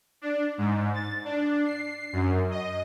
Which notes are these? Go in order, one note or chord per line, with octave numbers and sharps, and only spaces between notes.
D4
G#2
A6
D4
C7
F#2
D#5